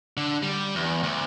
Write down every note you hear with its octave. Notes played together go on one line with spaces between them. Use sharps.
D3
G3
E2
D2